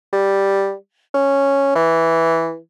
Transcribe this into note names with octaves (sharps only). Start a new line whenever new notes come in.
G3
C#4
E3